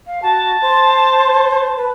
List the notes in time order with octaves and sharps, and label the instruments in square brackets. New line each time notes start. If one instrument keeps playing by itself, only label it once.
[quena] F5
[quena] F#4 [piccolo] A5
[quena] C5
B4